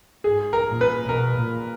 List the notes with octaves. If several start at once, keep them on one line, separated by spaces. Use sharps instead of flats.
G#2 G#4
A#4
A#2
B4
B2 A#4
A#2